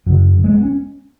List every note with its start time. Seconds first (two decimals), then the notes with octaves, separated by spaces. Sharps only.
0.06 F#2 C#3 F#3
0.44 G#3
0.53 B3
0.63 C#4